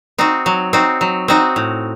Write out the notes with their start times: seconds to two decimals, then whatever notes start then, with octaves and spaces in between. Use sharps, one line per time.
0.18 C4 D#4 F#4
0.46 F#3
0.73 C4 D#4 F#4
1.01 F#3
1.28 C4 D#4 F#4
1.56 A2